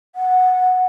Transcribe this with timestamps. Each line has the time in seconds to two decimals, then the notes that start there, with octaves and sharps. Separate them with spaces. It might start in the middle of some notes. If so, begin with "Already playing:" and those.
0.16 F#5